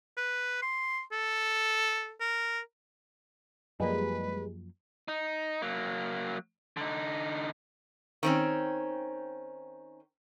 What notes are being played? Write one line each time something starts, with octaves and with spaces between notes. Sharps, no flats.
B4
C6
A4
A#4
F#2 F3 G3 G#3 A#3 B4
D#4
F#3 A#3
D3 D#4
D#3 C4 C#4